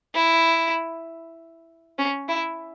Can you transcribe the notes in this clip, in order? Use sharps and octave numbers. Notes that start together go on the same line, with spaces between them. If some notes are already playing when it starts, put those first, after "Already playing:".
E4
C#4
E4